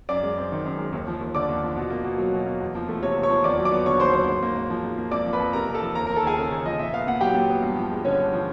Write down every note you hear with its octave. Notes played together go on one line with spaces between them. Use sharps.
F#2 D5 D6
G#3
C4
D#3
F#2
G#3
D#2
F3
D#2
D3 D5 D6
D#2
F3
B2
A#3
B2
F#3
B2
A#3
E2
F3
A3
C3 C#5 C#6
E2
C#5 C#6
F3
D#2 D5 D6
F#3
D5 D6
B3
D3 C#5 C#6
D#2 C5 C6
F#3 C5 C6
G#2
A#3
G#2
F3
G#2
A#3
F2 D5 D6
F3
B4 B5
F2
C3 A#4 A#5
F2
A4 A5
F3
D#2 A#4 A#5
F3 A#4 A#5
A4 A5
D#2 G#4 G#5
C#3 A4 A5
D#2
F3 D#5
A#2 E5
B3 F5
A#2 F#5
F#3 G4 G5
A#2
B3
G2
F3
G#3
D3 C#4 C#5
G2
F3